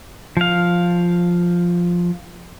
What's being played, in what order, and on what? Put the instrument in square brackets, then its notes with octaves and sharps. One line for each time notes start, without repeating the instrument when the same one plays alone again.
[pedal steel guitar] F3 F5